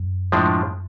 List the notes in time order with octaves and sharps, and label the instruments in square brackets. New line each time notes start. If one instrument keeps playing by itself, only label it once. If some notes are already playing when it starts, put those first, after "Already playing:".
Already playing: [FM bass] F#2
[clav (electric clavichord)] A2 F3 G#3 D4